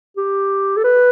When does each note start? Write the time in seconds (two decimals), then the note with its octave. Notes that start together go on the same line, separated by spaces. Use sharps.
0.17 G4
0.77 A4
0.84 B4